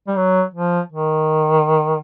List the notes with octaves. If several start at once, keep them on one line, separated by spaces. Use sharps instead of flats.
G3
F#3
F3
D#3